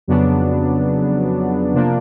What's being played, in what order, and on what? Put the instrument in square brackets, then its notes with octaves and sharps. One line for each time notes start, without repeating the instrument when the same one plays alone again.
[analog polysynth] F2 C#3 F#3 B3 D4
C3 F3 A#3 D4